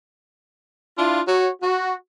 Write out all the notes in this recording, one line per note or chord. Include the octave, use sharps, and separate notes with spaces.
D4 E4 F4
F#4 C#5
F#4